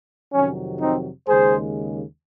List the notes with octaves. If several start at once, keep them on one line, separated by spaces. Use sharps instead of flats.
F2 C3 D#3 F#3 C#4
C4 D#4
D#2 C#3 G#3 G#4 C5